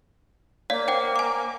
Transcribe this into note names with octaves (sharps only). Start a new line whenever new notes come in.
A#3 C#5 D5 F5
C5 F#5 G5
G#5 D6